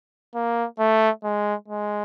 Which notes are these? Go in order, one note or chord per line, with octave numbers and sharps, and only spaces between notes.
A#3
A3
G#3
G#3